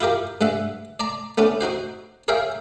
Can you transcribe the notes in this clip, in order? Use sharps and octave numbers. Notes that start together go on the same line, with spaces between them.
E4 F4 G4 A#4
G2 G#3 E5 F#5
D5 A5 A#5
A3 B3 C#4 D4
C4 D#4 F#4 C5
G#4 A#4 C#5 E5 F5 G5